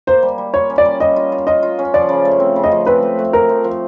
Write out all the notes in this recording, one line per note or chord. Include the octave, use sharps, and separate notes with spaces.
A#3 C5
G3
G3
F4 C#5
C#4
D5
G3
G3 D#5
F4
F4
F4 D#5
F4
C#4
F3 D5
C#3
A3
C4
C#3
D#5
F3
C4 B4
A3
A3
A3 A#4
F3
F3